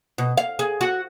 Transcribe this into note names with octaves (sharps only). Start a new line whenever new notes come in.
B2
F5
G#4
F#4